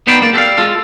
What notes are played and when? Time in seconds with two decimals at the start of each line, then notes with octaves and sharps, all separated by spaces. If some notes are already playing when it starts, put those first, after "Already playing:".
0.07 B3 D#4 B4 C5 D5 G5
0.21 C#2 A#3 D5
0.33 G4 A4 B4 D5 F5
0.58 G#3 F4 A4 F5